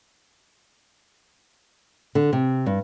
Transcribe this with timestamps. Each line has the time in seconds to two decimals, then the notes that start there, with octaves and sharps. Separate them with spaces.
2.15 D3
2.33 C3
2.66 G2